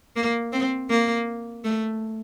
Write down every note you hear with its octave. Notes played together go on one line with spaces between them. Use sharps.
A#3
C4
A#3
A3